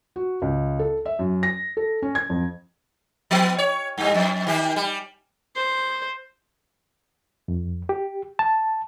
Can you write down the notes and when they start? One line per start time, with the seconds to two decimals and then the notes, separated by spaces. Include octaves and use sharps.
0.16 F#4
0.42 C#2
0.79 A4
1.06 E5
1.19 F#2
1.43 A#6
1.77 A4
2.02 C#4
2.15 G#6
2.30 F2
3.31 F3 B3
3.58 C#5
3.98 G2 G3
4.14 F2
4.47 D#3 G4
4.76 G3
5.56 C5
7.48 F2
7.89 G4
8.39 A5